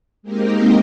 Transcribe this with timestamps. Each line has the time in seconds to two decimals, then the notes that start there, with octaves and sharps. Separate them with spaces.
0.23 G#3 A#3 C4 D#4 G4 A#4